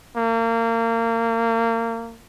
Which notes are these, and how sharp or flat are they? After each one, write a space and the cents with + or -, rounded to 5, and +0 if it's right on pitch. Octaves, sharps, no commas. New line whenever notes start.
A#3 -30